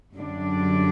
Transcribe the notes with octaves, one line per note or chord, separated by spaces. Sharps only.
F#2 D3 G3 D4